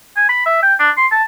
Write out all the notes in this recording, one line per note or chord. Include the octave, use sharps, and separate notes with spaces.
G#5
B5
E5
G5
D4
C6
A5